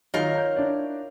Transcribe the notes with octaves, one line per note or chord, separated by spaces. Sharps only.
D#3 F#3 D#4 F4 A#4 C#5
A#5 G6
D4 E4 D5